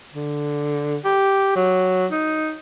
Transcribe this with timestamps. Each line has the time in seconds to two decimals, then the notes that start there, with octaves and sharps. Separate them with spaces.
0.14 D3
1.04 G4
1.56 F#3
2.12 D#4